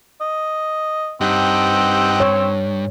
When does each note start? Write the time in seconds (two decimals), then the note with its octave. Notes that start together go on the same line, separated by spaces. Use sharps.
0.21 D#5
1.21 G2 C4 D#4 G4 F#5
2.20 C#5